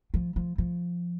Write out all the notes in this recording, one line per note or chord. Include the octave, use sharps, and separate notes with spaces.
F3
F3
F3